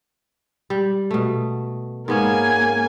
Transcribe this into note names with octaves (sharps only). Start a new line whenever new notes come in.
G3
B2 A3
G#2 A#3 B3 C#4 G#5